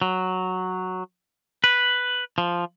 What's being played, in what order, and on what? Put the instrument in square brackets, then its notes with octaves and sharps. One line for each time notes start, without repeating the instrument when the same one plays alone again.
[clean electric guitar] F#3
B4
F3